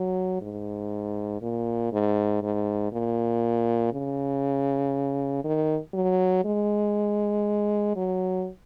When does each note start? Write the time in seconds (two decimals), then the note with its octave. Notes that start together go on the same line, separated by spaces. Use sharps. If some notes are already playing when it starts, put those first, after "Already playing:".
Already playing: F#3
0.42 G#2
1.42 A#2
1.93 G#2
2.43 G#2
2.92 A#2
3.93 C#3
5.44 D#3
5.94 F#3
6.45 G#3
7.96 F#3